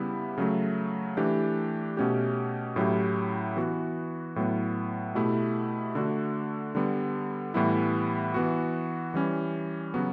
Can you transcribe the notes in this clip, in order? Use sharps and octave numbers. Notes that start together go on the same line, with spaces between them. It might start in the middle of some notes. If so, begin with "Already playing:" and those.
Already playing: C#3 G3 B3 E4 G4
C#3 F#3 A3
E3 A3 D4 G4
B2 A3 C#4 G4
A2 F#3 C#4 E4 G4
E3 B3 F#4
A2 F#3 B3
B2 A3 E4 G4
D3 A3 D4 F#4
D3 G3 B3
A2 E3 G3 B3 E4
E3 B3 F#4
E3 G3 C#4
C#3 F#3 B3 F#4